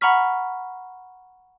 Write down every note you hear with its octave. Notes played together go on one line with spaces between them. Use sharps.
F#5 A#5 B5 C#6 F6 B6